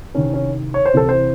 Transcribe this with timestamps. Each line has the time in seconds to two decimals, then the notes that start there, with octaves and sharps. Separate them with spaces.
0.14 C2 C3 D#3 C#4
0.34 C#4
0.74 C#5
0.86 C5
0.94 C2 C3 E3 A4
1.09 C5